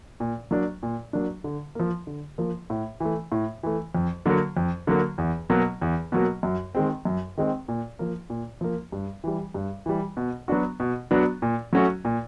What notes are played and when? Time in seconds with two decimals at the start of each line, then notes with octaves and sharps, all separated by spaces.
0.20 A#2
0.51 F#3 A#3 D4
0.83 A#2
1.13 F#3 A#3 D4
1.44 D3
1.75 F3 A#3
2.07 D3
2.38 F3 A#3
2.70 A2
3.00 E3 A3
3.32 A2
3.63 E3 A3
3.95 F2
4.26 D3 F#3 A#3
4.57 F2
4.87 D3 F#3 A#3
5.18 E2
5.50 B2 F#3 A#3
5.81 E2
6.12 B2 F#3 A#3
6.43 F#2
6.75 D#3 G#3 C4
7.05 F#2
7.37 D#3 G#3 C4
7.68 A#2
7.99 F3 A#3
8.30 A#2
8.61 F3 A#3
8.92 G2
9.24 E3 G3
9.54 G2
9.86 E3 G3
10.17 B2
10.48 F#3 B3 D4 F#4
10.80 B2
11.11 F#3 B3 D4 F#4
11.42 A#2
11.73 F#3 A3 C#4 F#4
12.05 A#2